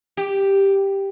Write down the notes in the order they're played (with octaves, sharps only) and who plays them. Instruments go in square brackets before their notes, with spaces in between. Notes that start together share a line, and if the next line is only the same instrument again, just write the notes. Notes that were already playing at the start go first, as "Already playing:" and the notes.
[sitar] G4